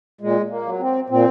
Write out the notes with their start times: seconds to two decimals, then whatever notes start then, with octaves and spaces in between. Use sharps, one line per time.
0.21 A#2 G#3
0.50 A#3
0.66 F#3
0.80 C4
1.09 A#2 C4